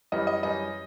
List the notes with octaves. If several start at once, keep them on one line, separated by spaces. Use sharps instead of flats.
F#2 E3 G3 D#5
D#5
F#2 E3 G3 D#5